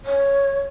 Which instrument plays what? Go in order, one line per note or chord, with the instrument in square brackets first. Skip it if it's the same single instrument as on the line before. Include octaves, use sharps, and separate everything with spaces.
[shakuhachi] C#5